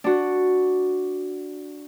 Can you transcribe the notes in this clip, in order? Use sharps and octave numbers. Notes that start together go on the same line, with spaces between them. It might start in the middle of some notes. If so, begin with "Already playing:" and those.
D4 F#4